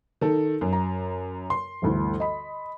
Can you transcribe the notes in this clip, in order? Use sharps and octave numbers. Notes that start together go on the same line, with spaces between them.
D#3 A4
F#2
A#5
C6
G1 D2 E3
D#5 B5